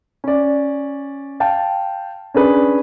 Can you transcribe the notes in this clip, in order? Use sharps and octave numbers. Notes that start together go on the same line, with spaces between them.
C#4 D5
F5 G5 A5
C#4 D4 G#4 B4